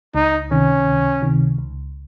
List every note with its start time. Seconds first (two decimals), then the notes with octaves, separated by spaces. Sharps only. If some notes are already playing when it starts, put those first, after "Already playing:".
0.15 C#2 D#4
0.51 C3 D#3 C#4
0.86 C#2
1.22 C3 D#3
1.58 C#2